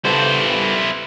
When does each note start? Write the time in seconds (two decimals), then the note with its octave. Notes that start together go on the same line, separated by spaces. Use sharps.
0.05 G3 B3 E4 A4 C5